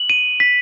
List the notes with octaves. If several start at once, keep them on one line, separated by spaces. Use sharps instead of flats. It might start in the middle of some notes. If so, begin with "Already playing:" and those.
Already playing: F#7
D#7
B6